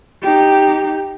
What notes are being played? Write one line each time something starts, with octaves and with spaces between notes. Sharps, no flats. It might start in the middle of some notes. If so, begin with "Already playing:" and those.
D#4 G4